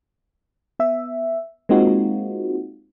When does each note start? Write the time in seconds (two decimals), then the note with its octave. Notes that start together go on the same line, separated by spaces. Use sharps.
0.79 B3 E5
1.69 G#3 A#3 C4 D#4 F4 F#4